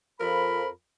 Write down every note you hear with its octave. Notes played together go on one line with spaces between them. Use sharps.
F2 F3 A#4 B5